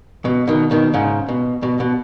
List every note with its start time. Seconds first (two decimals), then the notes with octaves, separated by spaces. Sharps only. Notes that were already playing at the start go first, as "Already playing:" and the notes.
0.25 B2
0.47 B2 D#3
0.71 B2 D#3
0.94 G#2 C#3
1.28 B2
1.63 B2
1.80 B2